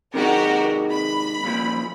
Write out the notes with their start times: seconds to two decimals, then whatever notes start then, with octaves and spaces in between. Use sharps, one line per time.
0.14 C3 D#3 G#3 F#4 G4 A#4
0.91 B5
1.44 C2 A#2 F3